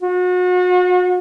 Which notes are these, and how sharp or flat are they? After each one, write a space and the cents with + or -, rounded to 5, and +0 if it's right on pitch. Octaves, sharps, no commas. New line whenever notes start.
F#4 -35